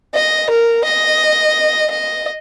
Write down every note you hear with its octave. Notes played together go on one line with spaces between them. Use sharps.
D#5
A#4
D#5
D#5